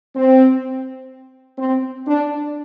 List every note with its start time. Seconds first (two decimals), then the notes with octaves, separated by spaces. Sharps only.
0.16 C4
1.59 C4
2.07 D4